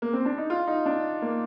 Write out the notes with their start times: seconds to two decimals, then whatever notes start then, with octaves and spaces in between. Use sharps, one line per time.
0.02 A#3
0.13 C4
0.25 D4
0.38 D#4
0.50 F4
0.67 D#4
0.86 D4
1.22 A#3